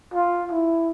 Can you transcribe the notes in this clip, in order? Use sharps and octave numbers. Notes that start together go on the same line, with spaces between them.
F4
E4